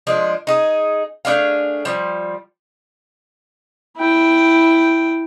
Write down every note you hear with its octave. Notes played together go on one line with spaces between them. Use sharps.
F3 G#3 D4
D#4 G#4
A3 D4 G#4 F5
F3 G3
E4 G5